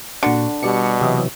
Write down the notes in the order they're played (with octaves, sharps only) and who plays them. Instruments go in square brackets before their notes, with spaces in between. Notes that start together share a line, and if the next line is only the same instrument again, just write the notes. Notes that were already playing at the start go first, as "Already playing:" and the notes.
[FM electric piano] A#2 F#4 [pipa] D3
[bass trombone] B2 [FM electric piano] G3 D5 C#7
[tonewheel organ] C3 E3 F#3 [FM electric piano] G4 D#5 E5